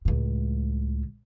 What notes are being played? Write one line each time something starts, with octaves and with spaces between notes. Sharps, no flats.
C#2 A2